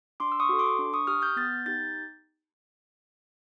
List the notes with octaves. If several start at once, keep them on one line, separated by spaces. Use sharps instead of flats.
D4 C6 D6
E6
C#6 D#6
F#4 A4
C6 D6
D4
C#6 D#6
G4 D#6 F6
F6 G6
B3 G6 A6
D#4 G4 G6 A6